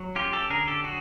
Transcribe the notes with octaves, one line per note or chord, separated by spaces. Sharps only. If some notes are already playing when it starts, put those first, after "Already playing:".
Already playing: F#3
C#4 F4 G4
G4 A4
D3 G#4 A#4
G4 A4
F#3 F#4 G#4